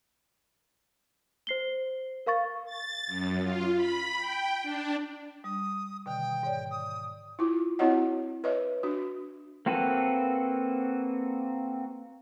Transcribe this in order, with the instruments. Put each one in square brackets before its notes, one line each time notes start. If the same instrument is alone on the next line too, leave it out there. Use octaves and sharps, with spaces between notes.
[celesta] C5 C7 G7
A#4 F5 C#6 A6
[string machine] A6
F#2
F4
B5
G5
D4
[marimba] G3 [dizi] D#6
[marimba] B2 D3 D#3 [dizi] G5
[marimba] G#2 C#5 D5
[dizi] D#6
[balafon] E4 F4
C4 E4 F#4 C#5 D#5 F#5
B4 C#5 D#5 E5
D4 F#4
[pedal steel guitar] A#3 C4 F#4 A4 B4